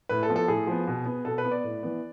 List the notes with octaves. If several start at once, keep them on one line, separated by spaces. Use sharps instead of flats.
A2 B4
A4
F3 B3
A4
A2 G#4
F3 B3
B2
B3
B2 A4
B4
B3
D5
A2
E3 B3